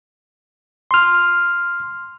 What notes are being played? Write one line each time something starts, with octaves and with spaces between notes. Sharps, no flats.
C6 F6